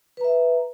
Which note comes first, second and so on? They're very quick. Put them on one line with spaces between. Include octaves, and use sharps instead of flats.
B4 A#5 E5